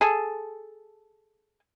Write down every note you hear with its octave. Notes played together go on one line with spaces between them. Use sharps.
G#4 A4